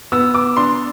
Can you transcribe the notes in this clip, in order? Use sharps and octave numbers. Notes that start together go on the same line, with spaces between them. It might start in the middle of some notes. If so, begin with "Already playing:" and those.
B3 E6
D6
D4 C6